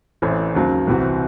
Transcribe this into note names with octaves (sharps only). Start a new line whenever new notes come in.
A1 A2 E3 C4
D#2 C#3 F#3 C4
C2 C3 E3 C4 F#4